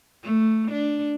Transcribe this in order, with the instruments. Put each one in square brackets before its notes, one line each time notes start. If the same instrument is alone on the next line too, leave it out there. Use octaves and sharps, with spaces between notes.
[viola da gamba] A3
D4